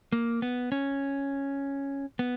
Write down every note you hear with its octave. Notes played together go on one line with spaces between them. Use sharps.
A#3
B3
C#4
B3